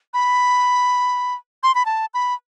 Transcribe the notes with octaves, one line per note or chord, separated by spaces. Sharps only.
B5
C6
B5
A5
B5